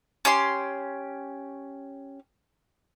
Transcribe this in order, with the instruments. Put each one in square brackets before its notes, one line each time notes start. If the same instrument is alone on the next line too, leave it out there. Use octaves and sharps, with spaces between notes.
[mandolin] C#4 G4 C6